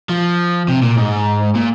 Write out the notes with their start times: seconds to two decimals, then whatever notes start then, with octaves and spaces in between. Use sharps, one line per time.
0.10 F3
0.68 C3
0.82 A#2
0.97 G#2
1.55 A#2